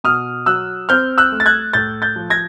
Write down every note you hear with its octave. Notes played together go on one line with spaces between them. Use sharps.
B2 D#6 F6
F#3 E6 F#6
C4 F6 G6
E6 F#6
A3
A6
F#6 G#6
A2 G6 A6
G6 A6
F3
G#6 A#6